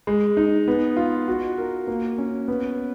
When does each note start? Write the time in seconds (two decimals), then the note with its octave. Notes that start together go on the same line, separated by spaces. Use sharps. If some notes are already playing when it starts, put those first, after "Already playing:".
0.07 G#3
0.37 D#4
0.68 B3
0.97 F4
1.28 F#4
1.58 A#4
1.87 A#3
2.18 C#4
2.48 B3